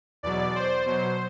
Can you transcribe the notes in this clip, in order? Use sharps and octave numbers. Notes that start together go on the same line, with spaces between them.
E2 B2 F#3 D5
C5
B2 F#3 C5